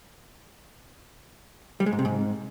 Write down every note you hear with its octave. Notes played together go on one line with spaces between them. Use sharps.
G3
G#3
G#2
C3
G#2